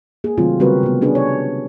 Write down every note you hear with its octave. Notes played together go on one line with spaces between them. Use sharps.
A#3 G#4
C3 D#3 F#3 A3 C4 F4
C#3 G3 C4 F#4 A#4 B4
C3 B3
B3 C#4 D4 G#4 B4
C#5